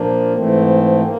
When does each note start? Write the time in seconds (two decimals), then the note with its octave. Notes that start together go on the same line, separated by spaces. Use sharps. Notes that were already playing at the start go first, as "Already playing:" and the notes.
Already playing: A#2 F3 A#3 D4
0.33 G#2 E3 A3 C4
1.03 A#3